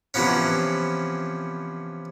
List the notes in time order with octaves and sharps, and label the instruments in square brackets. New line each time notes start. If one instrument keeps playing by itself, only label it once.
[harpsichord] C3 E3 F3 B3 C#4